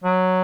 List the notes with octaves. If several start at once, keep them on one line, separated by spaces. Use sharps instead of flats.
F#3